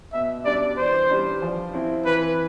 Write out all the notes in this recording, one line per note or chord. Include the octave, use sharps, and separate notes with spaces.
B2 E5
G3 D4 D5
E3 C5
G3 D4
F3
C4 E4
E3 B4